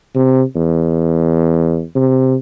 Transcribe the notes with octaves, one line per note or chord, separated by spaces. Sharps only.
C3
E2
C3